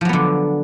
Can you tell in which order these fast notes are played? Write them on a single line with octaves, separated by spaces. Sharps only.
F3 F#3 B3 D3